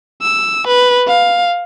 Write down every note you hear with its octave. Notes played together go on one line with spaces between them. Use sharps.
E6
B4
F5